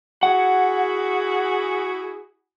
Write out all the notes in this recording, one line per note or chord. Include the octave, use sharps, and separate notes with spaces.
E4 F#4 G#4 F#5